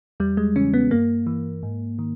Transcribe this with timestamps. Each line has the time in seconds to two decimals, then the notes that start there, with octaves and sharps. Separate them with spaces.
0.20 E2 G3
0.37 G#3
0.56 C#3 E3 C#4
0.74 B3
0.91 G2 A#3
1.27 E3
1.63 G#2
1.99 D#3